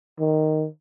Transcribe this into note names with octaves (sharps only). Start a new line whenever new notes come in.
D#3